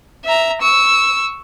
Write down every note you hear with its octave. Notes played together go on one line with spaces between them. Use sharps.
E5 A#5
C#6 E6